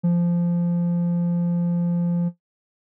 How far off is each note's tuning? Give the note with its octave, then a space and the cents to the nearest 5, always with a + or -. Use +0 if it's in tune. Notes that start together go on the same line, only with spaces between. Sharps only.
F3 -15